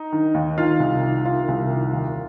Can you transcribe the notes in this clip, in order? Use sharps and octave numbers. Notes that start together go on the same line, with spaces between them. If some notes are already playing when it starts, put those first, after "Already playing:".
Already playing: D#4
D#3
D#2
D#3 F4 F5
C2
D#3
D#3 F4 F5
C2
D#3
D#2